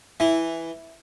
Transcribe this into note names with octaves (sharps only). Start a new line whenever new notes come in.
E3 E4